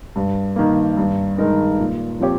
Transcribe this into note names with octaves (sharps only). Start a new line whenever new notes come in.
G2
D#3 A#3
G2
D#3 G#3 D#4 A#4
A#2
F3 C4 G4 C#5